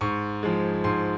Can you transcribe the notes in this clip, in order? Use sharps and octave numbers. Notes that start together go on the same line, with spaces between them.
G#2 C#6
F3 G#3
G#2 C6